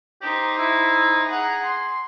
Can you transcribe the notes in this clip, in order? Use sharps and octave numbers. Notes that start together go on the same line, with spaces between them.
D#4 G4 C5
E4
G#4 F#5 A#5
C6